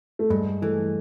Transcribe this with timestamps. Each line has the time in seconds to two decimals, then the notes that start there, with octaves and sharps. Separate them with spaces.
0.19 A3
0.30 G2 G#3
0.62 E3 A3